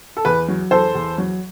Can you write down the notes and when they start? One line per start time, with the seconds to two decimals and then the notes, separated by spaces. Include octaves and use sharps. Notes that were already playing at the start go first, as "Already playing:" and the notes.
0.17 A4
0.25 E2 B4
0.48 F#3
0.71 E2 A4 C5
0.95 E2
1.18 F#3